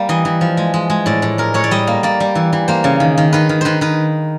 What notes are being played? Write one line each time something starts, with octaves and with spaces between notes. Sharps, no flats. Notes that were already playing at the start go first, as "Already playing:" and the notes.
Already playing: G3 A#3
E3 D#5
E3
F3
G#3
G#3
G#3
A2 D5
A2
G#3 A#4
A2 C#5
D5
G3 D#5
A#3
A#3 D5
G3
E3
E3
A#3 C5
C#3
D#3
D#3
D#3 B4
D#3
D#3 B4 C5
D#3 B4